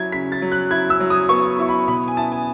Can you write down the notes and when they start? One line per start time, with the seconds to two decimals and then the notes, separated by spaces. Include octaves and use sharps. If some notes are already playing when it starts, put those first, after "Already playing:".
Already playing: F#3 E4 G#6
0.12 C#3 B6
0.32 A6
0.42 F#3
0.52 F#6
0.71 E4 G#6
0.90 E6
1.00 F#3
1.10 D#6
1.29 B3 C#6
1.59 E4 C#6
1.69 B5
1.88 B2 B5
2.08 G#5
2.17 E4 A5
2.32 G#5